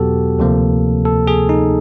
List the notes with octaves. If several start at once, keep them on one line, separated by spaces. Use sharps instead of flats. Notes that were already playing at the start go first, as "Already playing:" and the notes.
Already playing: E2 B2 F#3 B3 F#4 G4 A4
D2 C3 F3 A#3
A4
G#4
D#4